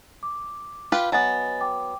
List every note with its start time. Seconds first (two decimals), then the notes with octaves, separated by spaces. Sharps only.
0.23 D6
0.92 F4 G4 B4
1.12 F#3 B3 D#5 G#5 A6
1.61 G5 D6